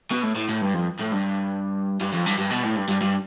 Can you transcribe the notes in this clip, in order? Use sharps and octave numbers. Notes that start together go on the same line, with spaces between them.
B2
A2
A2
A2
G2
F2
A2
G2
G2
F2
G2
G2
B2
A2
G2
G2
G2